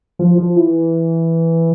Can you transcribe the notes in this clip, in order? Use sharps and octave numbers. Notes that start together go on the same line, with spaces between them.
F3
F3
E3